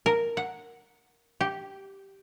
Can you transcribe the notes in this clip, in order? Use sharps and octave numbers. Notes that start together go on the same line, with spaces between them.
A#4
F#5
G4